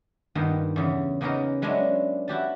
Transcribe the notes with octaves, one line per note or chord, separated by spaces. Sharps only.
G2 D#3 A#3 B3 F4
E2 C#3 B3
C#3 A#3 B3 C#4 D#4 A#4
F#3 G#3 B3 C#4 D4 E4
E4 F#4 G4 A5